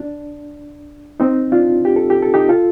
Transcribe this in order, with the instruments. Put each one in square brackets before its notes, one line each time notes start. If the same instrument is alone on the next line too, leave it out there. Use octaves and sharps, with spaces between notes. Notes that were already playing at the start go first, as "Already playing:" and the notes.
Already playing: [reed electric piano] D4
C4 D#4
D4 F4
G4
A4
G4
A4
D#4 G4
F4 A4